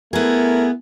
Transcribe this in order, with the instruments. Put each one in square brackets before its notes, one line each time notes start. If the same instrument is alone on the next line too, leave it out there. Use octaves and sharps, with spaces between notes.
[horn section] A3 E4 A#4 [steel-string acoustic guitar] B3 G#4